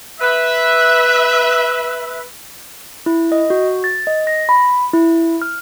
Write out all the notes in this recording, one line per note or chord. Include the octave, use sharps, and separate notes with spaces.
B4 E5
E4
D#5
F#4
A6
D#5
A#6
B5
E4
F6